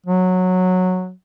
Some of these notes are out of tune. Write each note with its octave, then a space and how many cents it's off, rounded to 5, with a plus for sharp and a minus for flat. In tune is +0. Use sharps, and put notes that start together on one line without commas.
F#3 -10